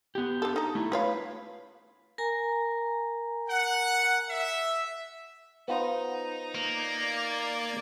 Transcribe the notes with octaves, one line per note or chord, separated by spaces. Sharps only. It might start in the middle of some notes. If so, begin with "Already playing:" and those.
B3 G4
D4 A4
D#4 A#5
A3 E4
F4 B4 C#5 F5
A#4 G#5 A#5
F#5
E5
B3 D#4 F4 C5
A#3 D5 G#6